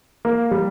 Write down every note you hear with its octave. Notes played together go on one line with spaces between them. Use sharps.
A#3
G3